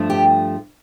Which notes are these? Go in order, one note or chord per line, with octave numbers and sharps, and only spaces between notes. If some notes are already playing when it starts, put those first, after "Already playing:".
Already playing: G2 F3 A3
G4